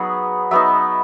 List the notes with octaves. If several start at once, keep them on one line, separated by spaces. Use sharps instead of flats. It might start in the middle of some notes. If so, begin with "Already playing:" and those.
Already playing: F#3 B3 D#4 G#4 B4
F#3 B3 D#4 E5